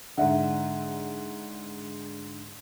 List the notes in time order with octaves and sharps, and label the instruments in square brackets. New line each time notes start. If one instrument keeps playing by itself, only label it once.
[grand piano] G#2 D3 [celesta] E5 F#5